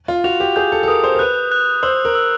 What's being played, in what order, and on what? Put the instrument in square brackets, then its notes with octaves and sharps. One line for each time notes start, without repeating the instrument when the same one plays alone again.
[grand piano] F4
[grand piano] F#4 [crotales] F7
[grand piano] G4
[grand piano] G#4 [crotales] G6
[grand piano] A4
A4
[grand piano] A#4 [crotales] D#6
[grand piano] C5
A#4
[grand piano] B4 [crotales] F#6
[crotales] F#6
[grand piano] C5 [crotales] E6
[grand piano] A#4
[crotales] E6